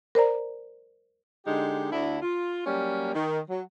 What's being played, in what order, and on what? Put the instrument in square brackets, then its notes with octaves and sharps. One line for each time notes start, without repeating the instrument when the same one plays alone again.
[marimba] A#4 C5 D5 A#5
[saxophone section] D3 G#3 D#4 G4
D2 D3 E4
F4
F#3 G3 A#3 C#4
D#3
F#3